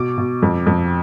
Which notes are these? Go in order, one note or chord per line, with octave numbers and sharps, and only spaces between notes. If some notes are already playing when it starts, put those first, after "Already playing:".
Already playing: B2 D6
B2
F2
F2